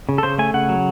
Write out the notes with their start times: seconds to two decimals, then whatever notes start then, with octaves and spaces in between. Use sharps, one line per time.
0.09 C#3
0.18 A4
0.23 C#3 C5
0.38 A3 G#5
0.54 C#3 F#5
0.69 F#3